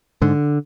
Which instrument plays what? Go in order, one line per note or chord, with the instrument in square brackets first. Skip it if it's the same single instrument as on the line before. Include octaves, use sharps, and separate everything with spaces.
[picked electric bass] G#2 D3